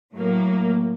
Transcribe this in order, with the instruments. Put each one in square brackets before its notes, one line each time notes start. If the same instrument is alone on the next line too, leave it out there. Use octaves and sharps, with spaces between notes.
[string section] A2 F#3 A#3